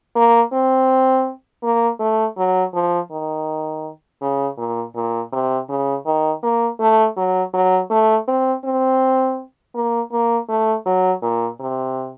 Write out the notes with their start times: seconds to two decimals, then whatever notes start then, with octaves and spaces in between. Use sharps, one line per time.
0.16 A#3
0.53 C4
1.63 A#3
2.00 A3
2.37 F#3
2.74 F3
3.11 D#3
4.22 C#3
4.58 A#2
4.95 A#2
5.32 C3
5.69 C#3
6.06 D#3
6.43 A#3
6.80 A3
7.17 F#3
7.54 F#3
7.91 A3
8.28 C4
8.64 C4
9.75 A#3
10.12 A#3
10.49 A3
10.86 F#3
11.22 A#2
11.60 C3